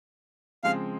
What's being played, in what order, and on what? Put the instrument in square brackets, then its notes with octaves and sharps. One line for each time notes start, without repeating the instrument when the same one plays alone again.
[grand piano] C#3 F3 G#3 C4 [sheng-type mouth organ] F5